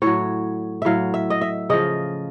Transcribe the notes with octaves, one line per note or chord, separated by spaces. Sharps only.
A2 F#3 C#5
A2 F#3 E5 F5
E5
D#5
E5
C#3 F3 D#5